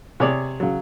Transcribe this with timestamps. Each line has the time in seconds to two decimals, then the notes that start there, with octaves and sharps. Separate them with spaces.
0.20 C3 G#4 C#5 D5
0.60 C#3 F#3